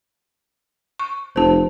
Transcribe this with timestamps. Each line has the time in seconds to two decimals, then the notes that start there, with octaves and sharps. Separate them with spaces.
0.99 C#6
1.36 F1 C5 A5